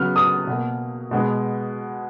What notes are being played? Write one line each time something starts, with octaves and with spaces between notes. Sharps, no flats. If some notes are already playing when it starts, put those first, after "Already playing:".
Already playing: C#3 F#3 B3 F6
D#6
B2 A#3
B2 G#3 B3